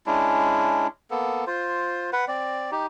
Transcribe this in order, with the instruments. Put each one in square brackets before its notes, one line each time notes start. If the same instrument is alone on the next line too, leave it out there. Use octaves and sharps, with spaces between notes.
[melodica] G#3 C#4 D4 E4
A#3 B3 A4
F4 C5
B4 F#5
C4 D5
D#4 G4